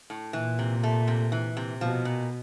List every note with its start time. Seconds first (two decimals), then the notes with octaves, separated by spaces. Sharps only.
0.10 A2
0.33 A#2 E3
0.59 C3
0.83 A3
1.08 C3
1.32 E3
1.57 C3
1.81 B2 F3
2.05 A#2